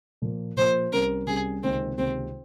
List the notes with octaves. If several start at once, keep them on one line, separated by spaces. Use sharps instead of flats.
A#2 F3 A#3
A#2 F3 A#3 C5
C2 C3 G3 C#4 A#4
C2 C3 G3 C#4 G#4
C#2 C3 D#3 A#3 C4
C#2 C3 D#3 A#3 C4